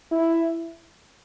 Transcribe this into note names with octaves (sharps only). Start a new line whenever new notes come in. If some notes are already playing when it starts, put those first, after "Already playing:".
E4